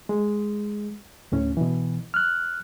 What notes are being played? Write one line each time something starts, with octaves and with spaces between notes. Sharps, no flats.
G#3
D2 A2 C#4
B2 E3
F6 F#6